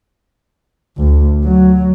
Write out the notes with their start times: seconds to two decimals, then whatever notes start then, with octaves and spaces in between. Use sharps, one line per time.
0.97 D2
1.44 F#3